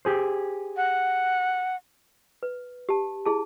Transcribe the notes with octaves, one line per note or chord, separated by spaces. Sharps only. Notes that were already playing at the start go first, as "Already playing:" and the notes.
G4 G#4 C5
F#5
B4
G4 A5
E4 G#4 A5